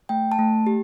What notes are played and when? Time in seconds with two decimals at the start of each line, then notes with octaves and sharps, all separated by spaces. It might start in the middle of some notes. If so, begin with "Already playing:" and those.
0.09 A3 G5
0.32 A5
0.39 A3
0.67 G4